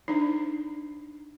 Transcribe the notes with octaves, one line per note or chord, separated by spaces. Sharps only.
D4 D#4